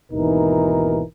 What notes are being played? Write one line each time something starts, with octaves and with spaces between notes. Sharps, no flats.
G#1 D#2 B2 E3 D#4 A#4